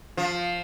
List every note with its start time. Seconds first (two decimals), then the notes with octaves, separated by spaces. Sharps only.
0.17 F3